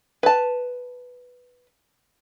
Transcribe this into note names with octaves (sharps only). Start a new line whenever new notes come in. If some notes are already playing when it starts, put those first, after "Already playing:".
B4 A5